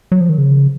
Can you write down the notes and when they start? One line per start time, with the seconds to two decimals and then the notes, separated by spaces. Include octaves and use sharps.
0.12 F#3
0.21 F3
0.29 D#3
0.38 C#3